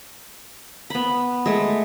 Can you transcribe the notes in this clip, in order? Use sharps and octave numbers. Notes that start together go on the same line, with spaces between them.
B3 B5
G#3 A3